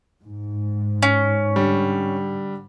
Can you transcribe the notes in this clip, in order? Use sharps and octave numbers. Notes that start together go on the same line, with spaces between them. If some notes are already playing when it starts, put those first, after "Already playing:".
G#2
C#4
D3 G3